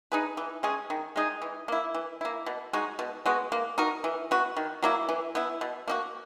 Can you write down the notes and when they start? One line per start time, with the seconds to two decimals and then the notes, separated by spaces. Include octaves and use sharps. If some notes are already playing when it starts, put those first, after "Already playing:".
0.12 D#4 G#4 B4
0.37 E3
0.63 G#3 C#4 G#4
0.90 D#3
1.16 G#3 D#4 G#4
1.42 E3
1.68 A#3 E4
1.95 E3
2.21 A#3 E4
2.46 B2
2.73 G#3 D#4 F#4
2.99 B2
3.26 G#3 B3 F#4
3.52 A#3
3.78 D#4 F#4 A#4
4.04 E3
4.31 B3 F#4
4.57 D#3
4.83 F#3 A#3 E4
5.09 E3
5.35 B3 E4
5.61 B2
5.88 A#3 D#4 F#4